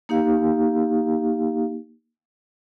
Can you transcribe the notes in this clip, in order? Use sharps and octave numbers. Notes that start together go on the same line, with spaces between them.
A#3 D#4 G4 F5